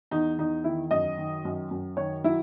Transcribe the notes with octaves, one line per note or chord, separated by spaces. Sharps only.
E2 D#4
E2 D#4
D#3 E4
F#2 D#5
D#3
F#2
F#2
D#3 C#5
F#3 E4